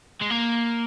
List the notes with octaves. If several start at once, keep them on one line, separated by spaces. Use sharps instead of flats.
G#3
A#3